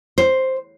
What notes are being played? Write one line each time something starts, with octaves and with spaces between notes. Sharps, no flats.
C5